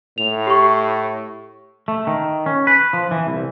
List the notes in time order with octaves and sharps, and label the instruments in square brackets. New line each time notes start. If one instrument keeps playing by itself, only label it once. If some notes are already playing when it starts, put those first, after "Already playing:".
[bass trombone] A2 [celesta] F7
[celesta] G4 C#6
[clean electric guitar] A3
D#3
C#4
B4
F3
E3
C2